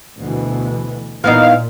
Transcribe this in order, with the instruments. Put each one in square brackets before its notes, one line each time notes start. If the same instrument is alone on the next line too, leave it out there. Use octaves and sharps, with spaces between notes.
[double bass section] D2 B2 E3
[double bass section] A#2 [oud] E3 B3 D#4 [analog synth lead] F5